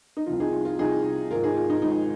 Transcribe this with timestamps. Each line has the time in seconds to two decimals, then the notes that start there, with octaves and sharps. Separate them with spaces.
0.17 D#4
0.26 C2 C3 F3 F4
0.40 D#4 G#4
0.52 F4
0.65 F4
0.78 C2 C3 F3 D#4 G#4
1.30 G#1 G#2 F3 F4 A#4
1.43 D#4 G#4
1.57 F4
1.70 D#4
1.82 G#1 G#2 F3 D#4